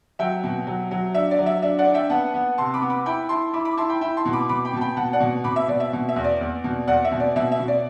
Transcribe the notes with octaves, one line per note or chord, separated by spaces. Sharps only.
F#3 E5 G5
B2
F#3
F#3
D4 E5
D5
F#3
E5
D4 E5
D5 F#5
D4
E5 G5
B3 F#5 A5
B3
C3 A5 C6
B5 D6
B3
B5 D6
E4 G5 B5
E4 A5 C6
E4 B5 D6
B5 D6
E4 A5 C6
G5 B5
E4 G5 B5
A5 C6
B2
B5 D6
B2 B5 D6
G5 B5
B2 A5
G5 B5
B2 F#5 A5
D5 F#5
B2
B2 B5 D6
E5
B2 D5
E5
B2
E5
E2
D5
E2
B2
E2 D5 F#5
E5
B2
D5
B2 E5
E5
B2
D5